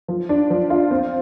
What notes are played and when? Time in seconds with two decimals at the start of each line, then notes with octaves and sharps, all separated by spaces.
0.08 F3
0.29 D4
0.50 F3
0.70 F4
0.91 C4